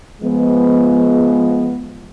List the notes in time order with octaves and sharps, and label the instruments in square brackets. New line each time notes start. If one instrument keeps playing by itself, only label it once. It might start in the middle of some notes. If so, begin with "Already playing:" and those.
[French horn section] F3 G#3 B3